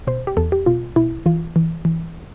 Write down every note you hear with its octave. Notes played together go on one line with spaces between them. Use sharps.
B2 C5
G4
E2 A4
G4
B2 F4
B2 E4
E3 F4
E3
E3